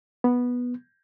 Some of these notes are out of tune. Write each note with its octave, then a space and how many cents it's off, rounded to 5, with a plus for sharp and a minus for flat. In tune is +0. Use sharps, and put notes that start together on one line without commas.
B3 -10